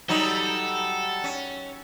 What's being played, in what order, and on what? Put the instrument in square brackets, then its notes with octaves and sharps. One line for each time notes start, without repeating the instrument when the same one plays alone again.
[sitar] F#3 G3 D#4 [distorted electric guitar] A4
[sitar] C#4